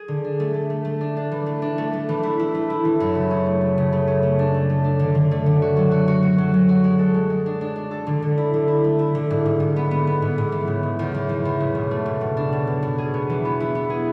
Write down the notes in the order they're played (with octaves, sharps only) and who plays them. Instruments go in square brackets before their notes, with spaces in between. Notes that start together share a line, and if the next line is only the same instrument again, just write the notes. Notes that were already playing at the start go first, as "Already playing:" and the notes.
Already playing: [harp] G#4
D3
D4
A3
A3
A3
A3
D4
D4
E3
A3
D4
A3
A3
E3
E4
E4
A3
E4
E3
F#2
C#3
C#4
A3
A3
C#3
A3
C#4
A3
D4
A3
A3
D4
D3
D3
A3
D3
F#4
F#3
F#4
F#4
F#4
F#3
F#3
F#4
G#3
A4
G#3
G#3
D4
D4
D4
A4
D3
D3
E4
D3
E4
A3
E4
D3
G#2
G#2
G#2
B3
B3
B3
G#2
G#2
E3
C#3
C#3
E2
E2
E3
E2
C#3
B2
A3
B2
B2
D4
B2
B2
B2
G#4
B3
E3
B3
E4
B3
G#4